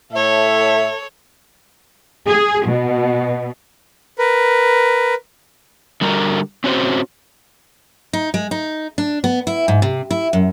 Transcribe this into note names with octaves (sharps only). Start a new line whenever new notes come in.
A2 A4 C#5 E5
G#4
B2
A#4 B4
D3 G3 F#4 A#4
C4 C#4 F#4 C5
D#4
G#3
D#4
D4
B3
E4
G#2
C3
E4
F#2